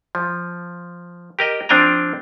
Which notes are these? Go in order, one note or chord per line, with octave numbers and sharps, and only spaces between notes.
F3
G4 A#4 D#5
F3 C4 D4 G5 G#5 A#5